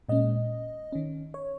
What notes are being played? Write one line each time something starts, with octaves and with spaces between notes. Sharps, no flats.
A#2 G#3 C#4 D#5
D#3 C#4
C#5